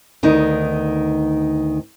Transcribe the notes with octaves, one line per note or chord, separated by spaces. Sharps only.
D2 D#3 B3 D#4